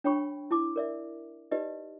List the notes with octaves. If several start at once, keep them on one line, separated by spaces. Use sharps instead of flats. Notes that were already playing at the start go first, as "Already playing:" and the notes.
D4 C#5 G5 B5 C#6
E4 A5 D6
A#4 D5 E5
D#4 G4 B4 D5 D#5